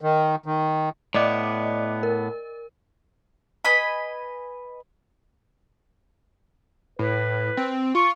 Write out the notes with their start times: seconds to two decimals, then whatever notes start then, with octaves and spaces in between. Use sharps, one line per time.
0.01 D#3
0.46 D#3
1.15 A2 B3 D5 D#5 D6
2.03 A#4
3.65 B4 D#5 G#5 B5
6.99 A2 B4
7.57 C4
7.95 F4 C#6